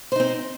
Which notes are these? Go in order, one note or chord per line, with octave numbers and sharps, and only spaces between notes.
C4 D#4 C5